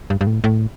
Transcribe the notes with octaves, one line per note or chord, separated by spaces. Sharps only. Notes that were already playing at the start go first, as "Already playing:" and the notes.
G2
G2
A2
A2